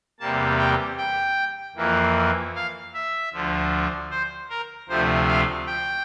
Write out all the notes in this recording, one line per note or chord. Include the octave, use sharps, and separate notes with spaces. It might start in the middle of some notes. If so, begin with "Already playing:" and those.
E2 C3 G3 A#3 A5
G5
G5
F2 E3 A#3
F5
E5
D2 D3 F3
C5
A#4
D2 C3 F3 A3 C5
F5
G5